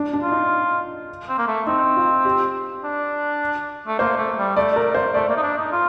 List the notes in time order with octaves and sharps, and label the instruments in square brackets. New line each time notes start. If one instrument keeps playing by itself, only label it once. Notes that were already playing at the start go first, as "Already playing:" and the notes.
Already playing: [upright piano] D4
D4
[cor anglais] F4
[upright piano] D#4
[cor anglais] C4
A#3
A3
[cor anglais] C4 [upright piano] D#4
[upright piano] F4
G4
[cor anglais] D4
A3
[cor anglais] A#3 [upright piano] C5
[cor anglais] A3
G3
[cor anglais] A3 [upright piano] D5
[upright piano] A#4
C5
[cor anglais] A3 [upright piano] D5
[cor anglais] A#3
D#4
D4
D#4
F4